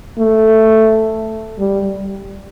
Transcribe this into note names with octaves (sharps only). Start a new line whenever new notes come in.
A3
G3